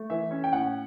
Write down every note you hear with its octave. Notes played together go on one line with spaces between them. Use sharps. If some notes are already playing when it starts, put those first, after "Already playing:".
Already playing: A3
E3 E5
C#4
G5
A2 F#5